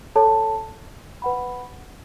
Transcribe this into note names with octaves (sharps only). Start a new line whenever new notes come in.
A4 C#5 A5
B4 F#5 B5